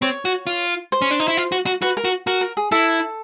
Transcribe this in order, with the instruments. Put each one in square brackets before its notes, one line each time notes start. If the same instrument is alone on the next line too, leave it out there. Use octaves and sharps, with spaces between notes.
[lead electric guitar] C4 [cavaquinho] C#5
[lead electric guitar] F#4
F4
[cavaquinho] C5
[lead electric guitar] C#4
D4
D#4
E4
F4
F#4
F#4
[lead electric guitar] F#4 [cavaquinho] B4
[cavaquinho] A#4
[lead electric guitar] F#4
[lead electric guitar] F#4 [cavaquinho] A#4
[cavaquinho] A#4
G#4
[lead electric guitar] E4 [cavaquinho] A4